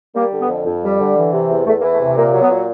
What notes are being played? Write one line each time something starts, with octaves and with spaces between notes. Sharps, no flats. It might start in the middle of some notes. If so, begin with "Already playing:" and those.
G3 A#3
D3
B3
F2
F2
G3
D3
E3
C3
E2
E2 A3
A#3
E3
A3
C3
A3
A#2 A#3
F#3
B3
A#2